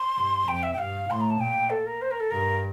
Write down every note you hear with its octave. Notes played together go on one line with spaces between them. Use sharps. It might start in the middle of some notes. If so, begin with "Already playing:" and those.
Already playing: C6
G2
F2 G5
E5
G5
G2 F5
A2 C6
A#5
A5
A#2 G5
A4
A#4
C5
A#4
A4
G2 A#4